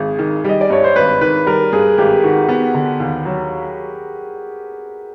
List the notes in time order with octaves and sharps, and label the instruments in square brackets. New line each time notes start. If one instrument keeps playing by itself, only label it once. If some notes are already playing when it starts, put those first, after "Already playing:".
Already playing: [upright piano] G#1 [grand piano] G#4
[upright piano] D#3
[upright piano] G3 [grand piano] D#5
[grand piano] D5
[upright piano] G2 [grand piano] C#5
[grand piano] C5
[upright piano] G#1 [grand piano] B4
[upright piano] D#3 [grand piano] B4
[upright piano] G3 [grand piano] A#4
[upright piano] G2 [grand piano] G#4
[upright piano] G#1 [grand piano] G4
[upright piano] D#3 [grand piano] F#4
[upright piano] B3
D3
D#2
F#3